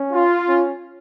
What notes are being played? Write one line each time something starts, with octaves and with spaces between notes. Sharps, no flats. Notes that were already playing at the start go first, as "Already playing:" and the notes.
Already playing: C#4
F4
C#4